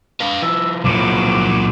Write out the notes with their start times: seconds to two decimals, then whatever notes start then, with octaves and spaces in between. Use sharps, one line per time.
0.20 B4 F5
0.42 F3 E4 E6
0.85 A#2 F#3 D6